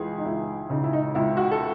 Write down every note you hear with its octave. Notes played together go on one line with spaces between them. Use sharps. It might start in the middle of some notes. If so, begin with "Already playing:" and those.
Already playing: C#2 E3 G#4
D#4
C#2 E4
C#3 D#4
E4
D#4
C#2 E4
F#4
A4